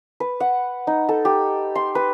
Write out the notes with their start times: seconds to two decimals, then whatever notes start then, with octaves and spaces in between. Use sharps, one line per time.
0.20 B4
0.40 F#5
0.87 D#4
1.09 A4
1.25 G4
1.75 C6
1.95 B4